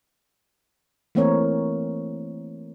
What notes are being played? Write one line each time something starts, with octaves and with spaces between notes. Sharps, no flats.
E3 A3 A#3 C4 A#4 C#5